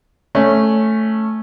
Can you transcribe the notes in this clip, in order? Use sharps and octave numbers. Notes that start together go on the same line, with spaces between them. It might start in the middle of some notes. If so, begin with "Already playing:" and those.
A3 C#4